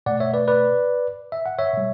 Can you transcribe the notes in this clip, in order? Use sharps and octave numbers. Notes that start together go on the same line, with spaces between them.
B2 A3 D5 F#5
C#5 E5
B4 D5
B4 D5
E5
F#5
C#5 E5
B2 G3